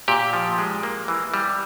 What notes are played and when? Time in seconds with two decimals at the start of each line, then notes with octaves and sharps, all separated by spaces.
0.08 A#2 G4
0.33 F3
0.58 G#3
0.83 A#3
1.08 E3
1.34 G3